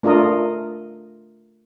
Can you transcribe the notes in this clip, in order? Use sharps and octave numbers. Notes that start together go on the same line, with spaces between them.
A3 D4 F4 A#4 D#5